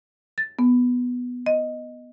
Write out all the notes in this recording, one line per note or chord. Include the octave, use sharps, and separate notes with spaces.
A6
B3
D#5